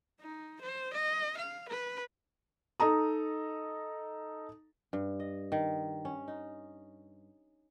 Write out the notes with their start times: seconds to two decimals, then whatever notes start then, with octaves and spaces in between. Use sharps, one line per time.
0.20 D#4
0.61 C5
0.94 D#5
1.38 F5
1.69 B4
2.80 D#4 A4 A#5 D#6
4.93 G2
5.20 D#5
5.52 D#3
6.05 C#4
6.28 D#4